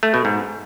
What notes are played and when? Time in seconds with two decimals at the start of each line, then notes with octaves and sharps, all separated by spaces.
0.03 A3
0.14 B2
0.25 G#2